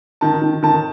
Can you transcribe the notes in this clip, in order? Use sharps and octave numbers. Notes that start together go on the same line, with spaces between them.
D#3 A5
D#3
D#3 A5